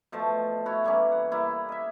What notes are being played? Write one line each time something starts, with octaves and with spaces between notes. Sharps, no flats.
B2 F3 A3 A5
E4 F#4 C#5
E3 G3 A#3 C#4
F#5
G3 A#3 E4
D#5 E5